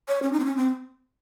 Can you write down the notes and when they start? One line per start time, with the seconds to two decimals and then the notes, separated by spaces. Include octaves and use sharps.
0.08 C#5
0.23 C#4
0.32 D#4
0.40 C4
0.45 C#4
0.57 C4